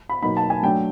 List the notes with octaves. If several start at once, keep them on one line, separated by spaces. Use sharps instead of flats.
B5
B2 F#3 A#3 D#4 B5
A5
G#5
F#3 A3 D4 G5